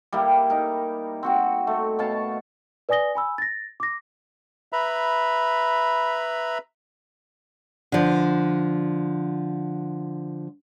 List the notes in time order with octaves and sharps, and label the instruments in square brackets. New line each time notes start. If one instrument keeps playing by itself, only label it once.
[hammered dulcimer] G3 A#3 E4 G4
D#4 A#4
C4 F#4 F#5
A3
B2 C#5 F5 A5
[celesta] B4 D5 G#5 D#6 A#6 G7
G#5 B5 E6
A6 A#6
D6 A#6
[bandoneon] B4 E5 A#5 B5
[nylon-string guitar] D3 F3